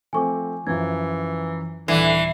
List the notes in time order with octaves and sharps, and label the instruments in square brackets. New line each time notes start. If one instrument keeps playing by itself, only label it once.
[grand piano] F3 A3 C4 [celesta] G#5 C#6 D6
[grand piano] F#2 F3 [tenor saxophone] E3 [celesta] G#6
[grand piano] D#1 C#7 [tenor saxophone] D3 [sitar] E3 [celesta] C7
[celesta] C7